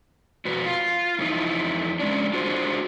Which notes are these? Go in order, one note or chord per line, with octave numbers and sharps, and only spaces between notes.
F2 B2 F#4 B4
F4
F2 E3 D#4 E4
G#3 C#4 D4
D4 F4 F#4 G#4 C5